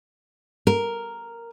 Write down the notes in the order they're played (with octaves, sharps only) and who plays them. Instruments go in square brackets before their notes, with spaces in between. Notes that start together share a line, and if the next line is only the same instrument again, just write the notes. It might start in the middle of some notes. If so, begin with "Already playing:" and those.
[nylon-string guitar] A#4